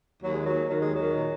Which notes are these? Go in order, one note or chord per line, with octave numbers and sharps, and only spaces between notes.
D#2 F#3
D#3 G#3
F#3
D#2
D#3 F#3
D#2 G#3
D#3 F#3
A#2